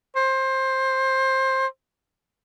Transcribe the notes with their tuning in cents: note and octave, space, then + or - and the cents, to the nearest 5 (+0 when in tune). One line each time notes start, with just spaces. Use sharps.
C5 +20